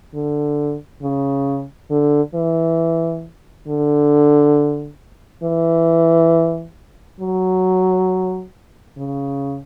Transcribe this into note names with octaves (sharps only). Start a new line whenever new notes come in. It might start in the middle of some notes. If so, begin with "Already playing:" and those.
D3
C#3
D3
E3
D3
E3
F#3
C#3